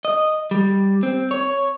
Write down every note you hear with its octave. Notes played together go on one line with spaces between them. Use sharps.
D#5
G3
C4
C#5